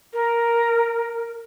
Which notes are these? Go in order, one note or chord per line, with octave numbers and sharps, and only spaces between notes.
A#4